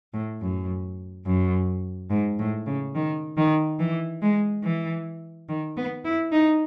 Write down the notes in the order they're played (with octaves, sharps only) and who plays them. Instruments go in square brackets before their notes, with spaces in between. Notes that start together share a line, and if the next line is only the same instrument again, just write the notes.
[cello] A2
F#2
F#2
G#2
A2
C#3
D#3
D#3
E3
G#3
E3
D#3
B3
E4
D#4